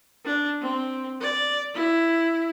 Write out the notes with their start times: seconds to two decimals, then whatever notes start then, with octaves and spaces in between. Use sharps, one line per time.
0.25 D4
0.62 C4
1.20 D5
1.74 E4